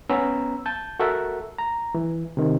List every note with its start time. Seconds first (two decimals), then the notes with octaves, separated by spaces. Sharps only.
0.10 B3 C#4 A#5 B5 E6
0.66 A5 G6
1.00 F#4 A4 A#4 E5 F#5
1.59 A#5
1.95 E3
2.37 C3 D#3